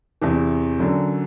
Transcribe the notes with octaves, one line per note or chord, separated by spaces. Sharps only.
E2 C3 E3
F#2 D3 F#3